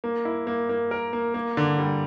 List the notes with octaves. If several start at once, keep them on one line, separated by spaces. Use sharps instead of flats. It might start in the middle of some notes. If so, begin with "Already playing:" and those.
A#3
E4
A#3
A#3
A#4
A#3
A#3
D3
G3